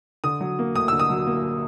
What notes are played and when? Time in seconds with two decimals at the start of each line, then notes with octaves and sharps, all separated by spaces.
0.24 D3 D#6
0.41 F#3
0.59 A#3
0.75 D2 D#6
0.88 D3 E6
1.00 D#6
1.10 F#3
1.27 A#3